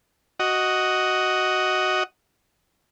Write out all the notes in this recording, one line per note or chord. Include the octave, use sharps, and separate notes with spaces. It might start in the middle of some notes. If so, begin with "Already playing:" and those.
F#4 D#5